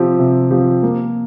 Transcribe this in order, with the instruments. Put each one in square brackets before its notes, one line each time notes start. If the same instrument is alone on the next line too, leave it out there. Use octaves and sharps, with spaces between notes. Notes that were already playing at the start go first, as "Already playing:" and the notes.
Already playing: [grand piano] C3 F3 C4 G4
C3
F3 C4 G4
A#3